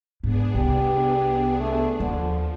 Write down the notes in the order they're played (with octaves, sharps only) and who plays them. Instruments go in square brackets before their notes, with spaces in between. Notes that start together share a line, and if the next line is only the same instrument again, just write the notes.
[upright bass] G#2 [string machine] B3 D4 G#4
[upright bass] C2 [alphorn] G4
[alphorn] A3
[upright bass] D#2 [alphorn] D3 [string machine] F3